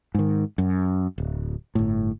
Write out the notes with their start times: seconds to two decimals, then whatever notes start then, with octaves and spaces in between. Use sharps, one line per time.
0.15 G#2 D#3
0.58 F#2
1.18 D1
1.75 G1 A2